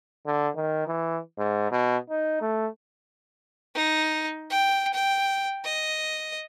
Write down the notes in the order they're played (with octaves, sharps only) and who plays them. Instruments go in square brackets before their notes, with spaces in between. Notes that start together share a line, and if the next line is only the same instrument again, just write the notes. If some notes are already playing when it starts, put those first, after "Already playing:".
[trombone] D3
D#3
E3
G#2
B2
D#4
A3
[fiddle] D#4
G5
G5
D#5